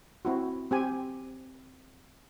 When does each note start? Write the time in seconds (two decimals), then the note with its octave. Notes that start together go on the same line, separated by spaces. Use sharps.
0.25 C4 E4 F#4
0.71 C4 G4 G#5